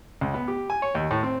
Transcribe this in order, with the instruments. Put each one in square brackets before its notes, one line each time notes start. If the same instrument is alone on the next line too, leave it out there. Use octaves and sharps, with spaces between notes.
[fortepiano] C#2
B3
G4
G#5
C#5
D#2
A2
C4